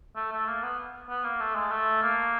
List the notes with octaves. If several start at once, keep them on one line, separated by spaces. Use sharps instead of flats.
A3
A3
A#3
B3
B3
A#3
A3
G#3
A3
A#3